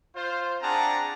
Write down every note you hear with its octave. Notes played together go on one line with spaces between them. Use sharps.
F4 C5
C4 D4 G#4 F#5 A5 A#5